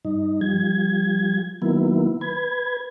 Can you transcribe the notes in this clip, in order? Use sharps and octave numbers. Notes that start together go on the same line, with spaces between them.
G2 D#4
F3 G3 G#6
D#3 F#3 A#3 B3 E4
B4 G#6